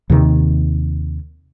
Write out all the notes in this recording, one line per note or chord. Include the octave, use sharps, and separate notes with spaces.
D#2 C3 D#3